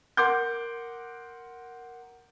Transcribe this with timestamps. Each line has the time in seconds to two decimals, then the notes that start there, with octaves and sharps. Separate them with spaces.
0.17 A#4 F#5 C6 D6 G6